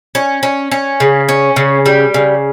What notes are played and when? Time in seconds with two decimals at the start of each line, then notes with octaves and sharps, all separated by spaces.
0.15 C#4
0.43 C#4
0.71 C#4
1.00 C#3
1.29 C#4
1.56 C#3
1.86 G3
2.14 C#3